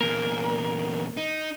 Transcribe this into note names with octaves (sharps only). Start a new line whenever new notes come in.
E2 A#2 A#4
D#4